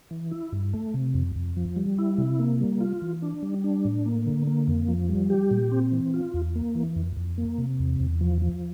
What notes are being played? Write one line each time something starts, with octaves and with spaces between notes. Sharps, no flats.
E3
E4
G2
A3
C3
F2
F2
F3
G3
E4
C3
A#3
G3
F4
E3
D4
G3
D4
A2
A#3
D3
A#3
F2
F3
G3
G4
A#2
C4
E3
F4
E2
A#3
E3
F2
F2
A#3
C3
E2
E2
F3
F3